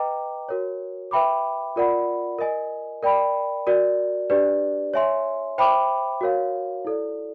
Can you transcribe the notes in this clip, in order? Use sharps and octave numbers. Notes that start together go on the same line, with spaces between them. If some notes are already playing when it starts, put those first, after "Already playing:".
Already playing: B4 D#5 G5 A#5 D6
F#4 A#4 C#5
B4 E5 G5 B5 D6
F4 A#4 D5 F#5 B5
A#4 D#5 G#5
A#4 D5 G5 B5
F#4 A#4 D5
D4 G4 B4 D5
C#5 E5 G#5 C6
C5 E5 G5 B5 D6
F#4 A#4 C#5 F5
E4 A4 D5